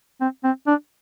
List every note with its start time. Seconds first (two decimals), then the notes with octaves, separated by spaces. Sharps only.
0.21 C4
0.44 C4
0.67 D4